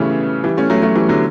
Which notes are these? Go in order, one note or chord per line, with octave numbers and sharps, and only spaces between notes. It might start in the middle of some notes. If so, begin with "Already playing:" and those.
Already playing: C#3 E3 G3 A3 B3 C#4
E3 G3
A3 C#4
F#3 A3
F#3 A3
E3 G3
D3 F#3